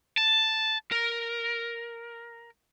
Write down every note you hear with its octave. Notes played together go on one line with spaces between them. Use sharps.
A5
A#4